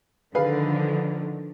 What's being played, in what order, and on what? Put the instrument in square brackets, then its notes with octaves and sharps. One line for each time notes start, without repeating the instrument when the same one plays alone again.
[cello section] D3 D#3 F3 [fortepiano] G#4 B4 F5